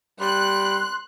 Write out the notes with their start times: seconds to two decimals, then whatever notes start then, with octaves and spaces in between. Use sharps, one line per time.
0.20 G3 C6 F#6